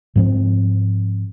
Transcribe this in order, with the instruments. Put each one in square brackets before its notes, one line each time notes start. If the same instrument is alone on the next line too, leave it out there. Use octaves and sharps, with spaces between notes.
[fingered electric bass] G#2 F3 C4